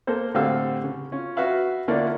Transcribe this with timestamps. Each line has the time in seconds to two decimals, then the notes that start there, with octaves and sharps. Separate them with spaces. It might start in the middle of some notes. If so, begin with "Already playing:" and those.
0.07 A#3 A4 C5
0.34 A2 D3 C4 G4 F5 E6
0.84 C#3
1.12 C#4 F4
1.36 F#4 B4 E5 F5 B5
1.88 D3 A#3 C#4 E4 F4 D5